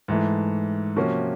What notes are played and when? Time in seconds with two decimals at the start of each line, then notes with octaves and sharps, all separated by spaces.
0.08 G#2 E3 A3
0.96 C3 F3 A#3 C#4 F#4